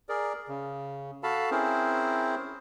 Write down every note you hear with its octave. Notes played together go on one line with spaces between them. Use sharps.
G#4 A#4 D5
C#3
F#4 A4 F5 A5 B5
C4 C#4 E4 G#4 A#4 C5